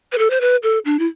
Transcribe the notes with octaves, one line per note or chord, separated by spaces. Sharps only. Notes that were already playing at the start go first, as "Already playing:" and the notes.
B4
A4
C5
B4
A4
D4
E4